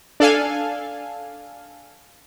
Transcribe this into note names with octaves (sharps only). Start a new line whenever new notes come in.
D4 A4 F5 G#5